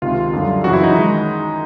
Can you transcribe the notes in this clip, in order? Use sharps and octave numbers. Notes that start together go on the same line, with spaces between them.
C#2 C3 D#3 F4
F#2 D3 G3
F#2 C#3 E3 F#4
E4
D#4
D#3 G#3